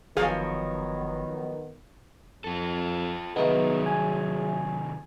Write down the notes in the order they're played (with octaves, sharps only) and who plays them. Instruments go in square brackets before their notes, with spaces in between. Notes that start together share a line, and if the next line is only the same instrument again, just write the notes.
[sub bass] G1 [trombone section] D#3 B3 [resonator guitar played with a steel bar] F3 F#3 C#5 [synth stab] G#4 F5
[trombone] F2 [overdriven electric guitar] F4 A4
[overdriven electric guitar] C2 D#3 [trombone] F#3 [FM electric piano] B3 D#4 [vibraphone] G#4 E5
[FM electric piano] G#5